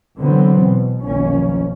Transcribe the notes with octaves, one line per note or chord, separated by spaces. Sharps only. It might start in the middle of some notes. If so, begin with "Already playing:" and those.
D3 E3 F#3 B3 C4
B2
F1 B1 D#3 F3 A#3 C#4